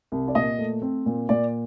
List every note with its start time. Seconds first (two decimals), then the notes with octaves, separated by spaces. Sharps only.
0.12 C2
0.28 D5
0.35 A#2 D#5
0.59 A3
0.82 C4
1.06 A#2
1.29 A#2 D5